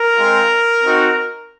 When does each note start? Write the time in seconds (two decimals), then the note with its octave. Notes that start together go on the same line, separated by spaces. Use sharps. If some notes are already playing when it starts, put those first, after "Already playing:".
Already playing: A#4
0.16 G#3 C4 F4
0.84 C4 D#4 F#4